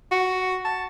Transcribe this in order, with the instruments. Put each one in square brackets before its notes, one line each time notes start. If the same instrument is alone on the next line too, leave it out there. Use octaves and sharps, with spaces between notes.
[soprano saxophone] F#4
A5